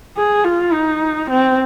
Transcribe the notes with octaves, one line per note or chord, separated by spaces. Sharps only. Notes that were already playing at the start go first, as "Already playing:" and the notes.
G#4
F4
D#4
C4